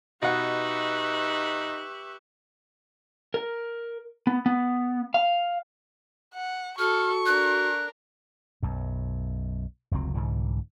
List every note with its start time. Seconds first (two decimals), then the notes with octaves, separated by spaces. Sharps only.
0.23 B2 D#4 G4 B4 E5 F#5 C#6 F#6
3.34 A#4
4.27 B3
4.46 B3
5.14 F5
6.35 F#5
6.79 F#4 A4 C#6 F6
7.26 D4 A#4 F#6
8.63 B1 F#2
9.91 F1 C#2 F#3 C4
10.14 C2 G#2 D3 E3